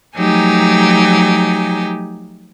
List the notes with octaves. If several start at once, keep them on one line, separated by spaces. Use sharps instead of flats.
F3 F#3 A3 D#4 G4 G#5